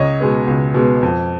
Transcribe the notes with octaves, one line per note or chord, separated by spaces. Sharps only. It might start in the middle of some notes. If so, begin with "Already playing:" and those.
Already playing: C#2 C#5 D#5
B2 G#3 B3
C#2
B2 G#3 B3
F2